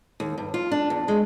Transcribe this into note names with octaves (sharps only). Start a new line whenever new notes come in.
D#2
G2
F4
D4
E2
G#3